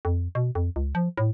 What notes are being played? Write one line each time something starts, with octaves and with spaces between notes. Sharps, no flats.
F2
B2
F2
C#2
F3
A2